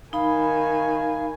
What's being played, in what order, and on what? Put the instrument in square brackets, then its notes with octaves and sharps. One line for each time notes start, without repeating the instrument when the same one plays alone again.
[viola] D#3 G#5 [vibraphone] D#4 B5 [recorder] F5